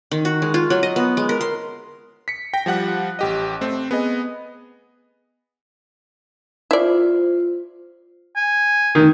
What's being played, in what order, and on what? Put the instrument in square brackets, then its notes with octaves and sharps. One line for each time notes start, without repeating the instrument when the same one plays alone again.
[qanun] D#3
F#4
G#3
F4
F#3
D#5
B3
G#3
A#4
C6
[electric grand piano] B6 C#7
G5 A#6
F3 G3 F#5 F#6
A1 G4 D#5
A3 C4
B3 G#4 D#5
[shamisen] E4 D5 [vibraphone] F4 C5
[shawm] G#5
[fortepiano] D#3